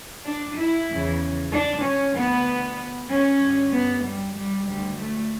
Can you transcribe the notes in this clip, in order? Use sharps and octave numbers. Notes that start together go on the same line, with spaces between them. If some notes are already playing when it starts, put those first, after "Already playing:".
D4
E4
E2 C#3 E3
D4
C#4
D2 D3 B3
C#4
G2 D3
B3
G3
G3
D2 D3 G3
A3